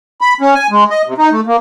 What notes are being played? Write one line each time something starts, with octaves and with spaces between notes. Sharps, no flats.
B5
C#4
G#5
G#3
D#5
C3
D#4
A3
A#3